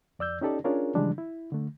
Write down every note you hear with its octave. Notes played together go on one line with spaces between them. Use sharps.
F2 D5 E6 G6
C#4 D#4 G4 A4 D5
C#4 D4 F4 G#4 A#4 C#5
C#3 E3 F3 G3 G#3 D4
E4
D3 A3